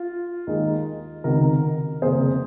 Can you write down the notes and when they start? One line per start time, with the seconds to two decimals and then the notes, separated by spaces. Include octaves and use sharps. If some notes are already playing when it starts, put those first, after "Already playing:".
Already playing: F4
0.47 D#2 D#3 G#3
1.24 C#2 C3 D#3 F#4 A#4
2.02 F#1 F2 C3 G#4 C5